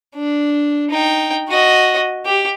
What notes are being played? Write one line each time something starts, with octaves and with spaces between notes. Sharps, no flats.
D4
D#4 G5
F#4 D#5
G4